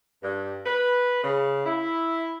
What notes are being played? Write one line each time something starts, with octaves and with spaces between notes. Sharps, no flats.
G2
B4
C#3
E4